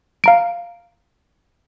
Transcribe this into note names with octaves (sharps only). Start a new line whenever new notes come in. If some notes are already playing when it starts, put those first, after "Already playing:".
F5 A#5 D7